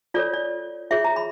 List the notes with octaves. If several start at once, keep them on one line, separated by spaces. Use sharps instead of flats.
F4 A4 C#5 D5
D5
F4 G#4 C#5 E5
A#5
B5